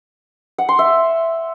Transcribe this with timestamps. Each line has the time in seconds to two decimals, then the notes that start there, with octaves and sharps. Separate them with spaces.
0.58 F#5
0.69 C6
0.79 E5